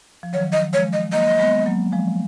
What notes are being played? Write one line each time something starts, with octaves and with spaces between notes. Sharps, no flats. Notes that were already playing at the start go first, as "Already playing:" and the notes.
F3
D#3 F#3 C#5
D#5
F3 G#3 C#5
D#5
F#3 A#3 D#5
G#3 B3
F#3 A#3
F3 G#3